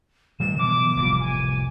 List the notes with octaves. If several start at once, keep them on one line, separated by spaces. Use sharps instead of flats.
D#3 G3 A3 E7
B2 E3 F#3 D6
F1 C2 A2
G#5